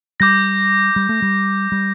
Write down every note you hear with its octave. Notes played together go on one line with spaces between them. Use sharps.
G3 D6 G6 A#6
G3
A3
G3
G3